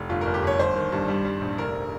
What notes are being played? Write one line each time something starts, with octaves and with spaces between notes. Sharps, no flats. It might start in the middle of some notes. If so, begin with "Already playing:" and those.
Already playing: F1
G1 F4
G1 A#4
G4
G1 C#5
G1 C5
D#3
G2
G3
G3
A#1
F1 A#4